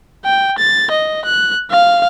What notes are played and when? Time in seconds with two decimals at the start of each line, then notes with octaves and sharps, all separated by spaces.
0.25 G5
0.58 A6
0.91 D#5
1.25 F#6
1.71 F5